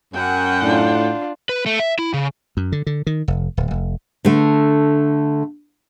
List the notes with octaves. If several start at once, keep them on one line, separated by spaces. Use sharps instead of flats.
F#2 F#5 G5
A2 D4 F4
B4
A3
E5
E4
C#3
F#2
D3
D3
D#3
F1
D1
F1
D3 A3